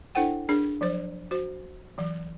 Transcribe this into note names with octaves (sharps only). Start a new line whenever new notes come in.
D4 E4 A4 C5 F#5 G5
D4 G#4 A#4
F3 F#3 C5
F#4 C5
E3 F#3